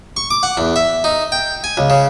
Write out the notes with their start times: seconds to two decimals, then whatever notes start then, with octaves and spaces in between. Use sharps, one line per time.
0.17 C#6
0.31 D6
0.43 F#5
0.57 E2
0.76 E5
1.04 D#4
1.32 G5
1.64 G#5
1.77 C#2
1.90 C#3